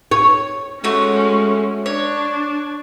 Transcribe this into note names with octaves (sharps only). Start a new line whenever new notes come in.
C#5
G#3 A3 C#4 F#4
D4 C#5